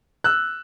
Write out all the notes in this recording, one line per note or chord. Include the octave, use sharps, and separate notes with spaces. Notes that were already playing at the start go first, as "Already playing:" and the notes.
E6 F#6